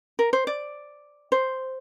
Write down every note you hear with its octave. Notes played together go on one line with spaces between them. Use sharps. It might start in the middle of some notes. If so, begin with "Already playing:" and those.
A#4
C5
D5
C5